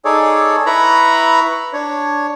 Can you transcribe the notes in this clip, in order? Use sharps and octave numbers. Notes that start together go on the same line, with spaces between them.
D#4 G#4 A4 C#5 D5
E4 B4 A#5 B5 C#6
D4 C#5